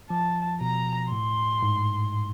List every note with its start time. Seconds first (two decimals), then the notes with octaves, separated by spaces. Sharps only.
0.10 F3 A5
0.61 B2 A#5
1.12 A2 C6
1.63 G#2